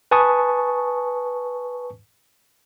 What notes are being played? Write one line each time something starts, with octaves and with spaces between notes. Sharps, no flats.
B4 G#5 A5 C#6 D#6